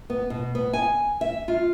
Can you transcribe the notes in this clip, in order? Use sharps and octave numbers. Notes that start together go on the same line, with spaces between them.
B3
B2
B3
G#5
E5
F4